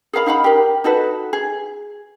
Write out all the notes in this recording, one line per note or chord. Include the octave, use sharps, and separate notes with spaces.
G#4 A#4 F5 B5
D#4 F5 F#5 B5
G4 A#4
D#4 F#4 A4 B4
G#4